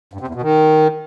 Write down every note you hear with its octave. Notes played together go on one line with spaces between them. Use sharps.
G2
C3
E2
B2
D#3